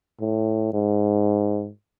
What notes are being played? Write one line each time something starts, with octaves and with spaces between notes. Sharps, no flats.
A2
G#2